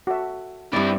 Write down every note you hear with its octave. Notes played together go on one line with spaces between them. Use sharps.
F#4 A4 E5
G2 C4 E4 D5